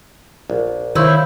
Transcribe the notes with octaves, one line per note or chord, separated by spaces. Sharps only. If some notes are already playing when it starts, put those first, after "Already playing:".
A#1
D#3 E4 C5 C#5 E5 F5 G6